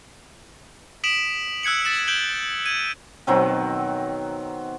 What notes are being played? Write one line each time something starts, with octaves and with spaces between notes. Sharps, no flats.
D#6 B6 D7 E7 F#7
E6 F#6 G#6 C#7 F#7
A6 B6 E7
G6 D7 F#7 G7
G#6 D#7
B2 D#3 F#3 C4